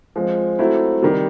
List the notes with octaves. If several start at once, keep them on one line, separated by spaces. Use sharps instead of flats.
F3 G#3 C4
F#3 A3 C4 E4
C3 D#3 G3